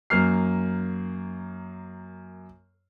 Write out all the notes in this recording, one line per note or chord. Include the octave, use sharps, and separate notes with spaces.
F#2 A#3 F6 C7